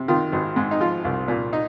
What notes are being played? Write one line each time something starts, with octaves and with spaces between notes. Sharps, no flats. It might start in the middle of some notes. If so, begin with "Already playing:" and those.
Already playing: C3
D#3 F4
G#1
G#2
D#4
F3 F4
C2
A#2
D#4